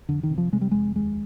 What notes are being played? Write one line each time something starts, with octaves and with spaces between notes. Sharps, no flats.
F2 D3
D#3
C3
F3
C3 G#3
G3
F2 G#3
D#2 G#3